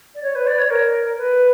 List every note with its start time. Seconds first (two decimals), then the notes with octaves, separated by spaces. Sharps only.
0.15 D5
0.22 C#5
0.35 B4
0.46 D5
0.58 C#5
0.70 A#4
1.17 B4